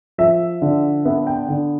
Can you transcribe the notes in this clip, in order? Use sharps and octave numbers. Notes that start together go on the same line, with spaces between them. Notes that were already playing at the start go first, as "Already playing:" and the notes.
F3 E5
D3
B3 E5
G5
D3